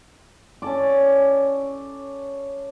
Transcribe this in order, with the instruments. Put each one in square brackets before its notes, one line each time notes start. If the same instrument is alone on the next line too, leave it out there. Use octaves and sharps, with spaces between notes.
[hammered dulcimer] C#4 A4 D5